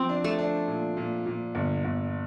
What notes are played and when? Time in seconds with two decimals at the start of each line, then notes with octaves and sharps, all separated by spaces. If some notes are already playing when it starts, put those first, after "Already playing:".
Already playing: F3 C4
0.09 D4
0.24 A3
0.39 D4
0.68 A#2
0.97 A#2
1.26 A#2
1.55 G1
1.85 G1